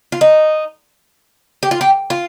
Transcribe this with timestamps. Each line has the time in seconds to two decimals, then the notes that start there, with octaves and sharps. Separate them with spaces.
0.12 F4
0.21 D#4
1.63 G4
1.71 F4
1.81 G4
2.10 F4